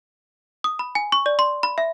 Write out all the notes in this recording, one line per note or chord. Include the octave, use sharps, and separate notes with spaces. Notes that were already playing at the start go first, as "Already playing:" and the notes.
D#6
B5
G#5
C#6
D5
C6
B5
E5